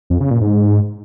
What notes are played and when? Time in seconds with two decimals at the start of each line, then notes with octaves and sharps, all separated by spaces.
0.10 F2
0.20 C#3
0.31 A#2
0.41 G#2